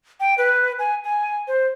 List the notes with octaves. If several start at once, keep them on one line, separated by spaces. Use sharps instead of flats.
G5
B4
G#5
G#5
C5